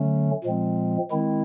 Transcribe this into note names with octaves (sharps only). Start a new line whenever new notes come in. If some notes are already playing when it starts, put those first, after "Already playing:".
Already playing: D3 F#3 A3 C#4
A#2 F3 G#3 C4
D#3 G#3 C4 E4